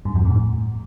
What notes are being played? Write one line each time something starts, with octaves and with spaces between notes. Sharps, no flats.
G2
F2
A2